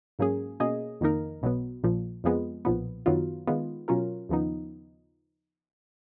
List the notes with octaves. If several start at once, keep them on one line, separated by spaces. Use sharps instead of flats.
G#2 F#3 A#3 C#4 G#4
B2 A#3 C#4 G#4 D#5
F2 D#3 A#3 D#4 A#4
B1 B2 F#3 B3
A#1 A#2 F3
F2 F3 G#3 B3
B1 A#2 F3 B3
F#2 D#3 F#3 B3 F4
D#3 G#3 B3 F4
B2 F#3 C#4 F4 A#4
D#2 C#3 F3 B3 D#4